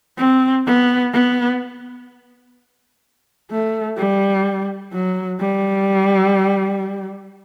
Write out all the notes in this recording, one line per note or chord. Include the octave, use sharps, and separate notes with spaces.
C4
B3
B3
A3
G3
F#3
G3